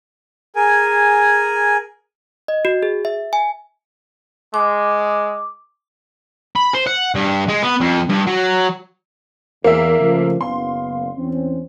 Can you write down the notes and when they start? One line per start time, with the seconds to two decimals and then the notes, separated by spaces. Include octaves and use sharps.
0.56 G#4 A#4 G#5
2.48 D#5
2.65 F#4
2.83 G#4
3.05 E5
3.33 G#5
4.54 G#3 D6
6.56 B5
6.75 C5
6.87 F#5
7.15 G2
7.49 G#3
7.63 B3
7.80 F2
8.09 G2
8.27 F#3
9.64 E2 A#3 E5
9.99 C#3 F3 A3
10.41 F#1 B3 F5 C6
11.17 E2 C4 C#4